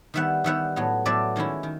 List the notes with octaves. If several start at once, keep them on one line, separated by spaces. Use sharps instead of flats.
D#3 G3 B3 E5 F#5
D#3 G3 B3 E5 F#5
A2 F#3 B3
A2 F#3 B3 D5 E5
D#3 G#3 C#4 E4
D#3